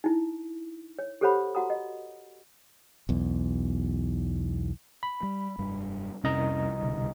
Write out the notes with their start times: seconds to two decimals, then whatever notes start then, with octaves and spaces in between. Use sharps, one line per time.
0.04 D#4 E4
0.99 C#5
1.21 G4 A4 C5 C#5 F#5 B5
1.55 F#4 F#5 A#5 D#6
1.70 D#5
3.09 B1 E2
5.03 B5
5.23 G3
5.58 F1 G2 G3
6.24 C2 F2 C3 C#4 D#5 A#5
6.81 D1 B2 D3